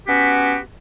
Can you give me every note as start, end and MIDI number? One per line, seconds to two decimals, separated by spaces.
0.07 0.56 59
0.07 0.56 61
0.07 0.56 66
0.07 0.56 67